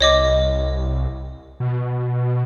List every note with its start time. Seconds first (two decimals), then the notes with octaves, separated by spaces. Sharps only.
0.01 C2 C#5 D#5 D6
1.60 B2